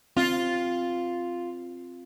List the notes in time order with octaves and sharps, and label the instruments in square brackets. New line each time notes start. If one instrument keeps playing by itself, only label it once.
[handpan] C4 [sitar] F4